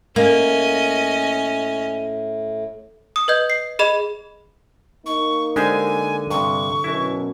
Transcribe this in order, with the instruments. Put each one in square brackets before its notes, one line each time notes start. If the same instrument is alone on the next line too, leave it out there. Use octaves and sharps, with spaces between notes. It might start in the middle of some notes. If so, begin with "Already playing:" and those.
[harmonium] A2 [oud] A#3 [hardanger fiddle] C#4 D#5
[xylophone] D#6
B4 D#5 G6
C7
G#4 D#5 B5 E7 F7
[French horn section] A#3 D#4 [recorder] C#6
[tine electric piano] D3 [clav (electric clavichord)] G#3 G4 C5 [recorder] G#5
[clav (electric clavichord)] G2 C3 [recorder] C#6
[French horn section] F#2 B2 [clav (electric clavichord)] E4 F#4